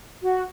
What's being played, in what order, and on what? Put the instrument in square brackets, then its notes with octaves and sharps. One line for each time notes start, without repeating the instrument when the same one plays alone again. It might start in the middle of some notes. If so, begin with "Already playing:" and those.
[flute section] F#4